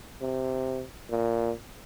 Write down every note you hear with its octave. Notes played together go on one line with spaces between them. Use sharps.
C3
A#2